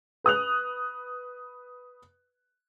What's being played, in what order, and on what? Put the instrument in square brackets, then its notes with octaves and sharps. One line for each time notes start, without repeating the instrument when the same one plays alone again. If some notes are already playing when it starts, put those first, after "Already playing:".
[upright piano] B4 D#6 F#6 F7